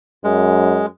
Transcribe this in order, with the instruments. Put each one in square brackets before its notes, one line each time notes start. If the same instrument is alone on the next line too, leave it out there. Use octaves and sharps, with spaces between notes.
[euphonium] F#2 [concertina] G#3